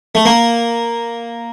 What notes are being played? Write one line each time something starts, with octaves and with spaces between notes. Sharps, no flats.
A3
A#3